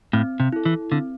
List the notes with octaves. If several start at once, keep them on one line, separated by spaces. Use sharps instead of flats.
A2 C4
C3
E4 A4
E3
D3 C4